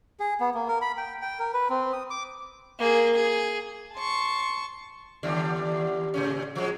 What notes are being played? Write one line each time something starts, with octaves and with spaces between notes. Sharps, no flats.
G#4
B3
A#3
A#4
B5
G5
G5
A#4
B4
C4
D#6
D6
A#3 G#4
G#4
A5 C6 C#6
D#2 D3 G3
A2 C#3 C#4
F3 F#3 G#3